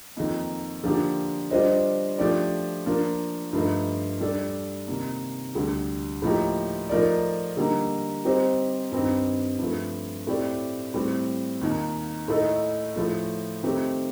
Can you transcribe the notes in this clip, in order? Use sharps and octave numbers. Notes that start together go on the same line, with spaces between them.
F2 D#3 A#3 D#4
D3 F3 A#3 D4 G4
G3 D4 F4 C5 D#5
F3 A3 D4 G4 D5
F3 A#3 D4 F4 A#4
G2 F3 A3 D#4
G3 D4 A4 D5
C3 D#3 A#3
D2 D3 G3
A2 F3 A#3 D#4 G4
F3 A3 D#4 A#4 D5
D3 G3 A#3 D#4
G3 C4 D#4 G4 C5
G2 D#3 G3 C4 D#4
G2 F3 A3
A2 A3 C4 G4 D5
A2 G3 C4
D#2 D#3 A#3
A2 A3 D#4 A4 D#5
A2 F3 A3
D#3 A3 C4 G4